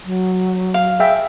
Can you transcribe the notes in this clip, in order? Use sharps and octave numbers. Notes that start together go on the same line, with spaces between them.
F#3
F5
G#4 E5 G5